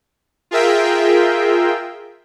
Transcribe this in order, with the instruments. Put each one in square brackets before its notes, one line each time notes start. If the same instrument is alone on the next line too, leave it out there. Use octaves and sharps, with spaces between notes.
[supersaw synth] F4 G#4 A#4 E5 G5